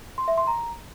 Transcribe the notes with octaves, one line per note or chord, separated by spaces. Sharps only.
C6
E5
C6
A#5